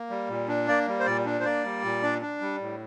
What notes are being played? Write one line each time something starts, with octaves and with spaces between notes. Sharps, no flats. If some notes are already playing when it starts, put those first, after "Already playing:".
Already playing: A#3
G3
A#2
D4
A#3 D5
G3
C5
A#2 D5
D4
C5
A#3 D5
G3
A#2
D4
D4
G3
A2